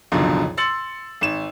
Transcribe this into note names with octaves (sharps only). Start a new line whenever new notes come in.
G#1 C#2 F#2 B2 D3 F3
C6 E6 A6 C#7 F#7
G#1 E7